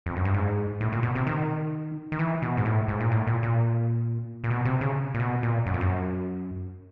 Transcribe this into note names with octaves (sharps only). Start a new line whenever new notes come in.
F2
F#2
G2
G#2
A2
A#2
B2
C3
D#3
D#3
E3
B2
G#2
A2
G#2
A#2
A2
A#2
A#2
A#2
B2
C3
C#3
A#2
B2
A#2
F#2
F2
F#2